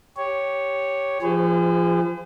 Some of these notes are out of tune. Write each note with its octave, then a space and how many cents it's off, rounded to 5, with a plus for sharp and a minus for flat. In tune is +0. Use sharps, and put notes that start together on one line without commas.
G4 -5 C#5 +0
F3 -20 G#4 -30 C5 -45